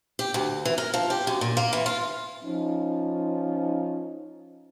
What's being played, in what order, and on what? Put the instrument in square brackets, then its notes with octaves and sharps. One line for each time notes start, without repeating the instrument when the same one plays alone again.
[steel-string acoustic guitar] G4
D2
E3
A#4
F3
G4
F#2
A#2
A#3
E3
F4
[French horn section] F3 C#4 D#4